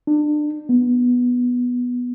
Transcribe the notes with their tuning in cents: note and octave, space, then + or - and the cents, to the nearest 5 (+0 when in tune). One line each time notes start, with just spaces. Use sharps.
D4 +30
B3 -5